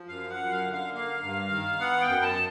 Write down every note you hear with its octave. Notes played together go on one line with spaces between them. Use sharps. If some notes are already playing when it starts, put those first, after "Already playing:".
Already playing: F3
F#2 F5
F#5
F#2
F5
D3
F5
A#3 F5
G2
D#3
B3 F#5
G5
F#2
A5